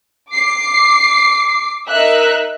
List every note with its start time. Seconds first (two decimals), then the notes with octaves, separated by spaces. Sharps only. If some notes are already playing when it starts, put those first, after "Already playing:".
0.30 D6 C7
1.89 D#4 A#4 E5 F#6